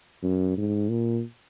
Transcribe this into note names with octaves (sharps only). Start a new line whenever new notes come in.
F#2
G#2
A#2